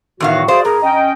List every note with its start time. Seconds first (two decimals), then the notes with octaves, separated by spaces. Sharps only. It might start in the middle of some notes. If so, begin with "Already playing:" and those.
0.20 E2 A2 D#3 F#3 F#4 F5
0.48 F#4 G#4 C5 D5 F5
0.65 G2 G#4 A#4 A#5
0.82 C#4 D#5 G5